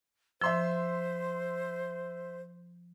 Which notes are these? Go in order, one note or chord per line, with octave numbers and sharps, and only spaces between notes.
F3 C5 E5 C6 E6